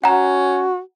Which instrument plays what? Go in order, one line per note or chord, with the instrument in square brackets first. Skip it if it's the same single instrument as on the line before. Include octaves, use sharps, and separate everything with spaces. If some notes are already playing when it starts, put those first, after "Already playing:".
[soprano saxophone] C#4 [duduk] F#4 [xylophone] F#5 A#5